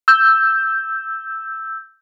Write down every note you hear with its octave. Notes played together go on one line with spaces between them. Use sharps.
E6 G6